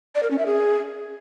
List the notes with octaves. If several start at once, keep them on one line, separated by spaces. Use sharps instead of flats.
D5
A#4
C#4
E5
G#4